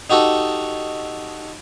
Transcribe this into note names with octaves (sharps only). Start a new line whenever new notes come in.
D#4 F#4 G4 A4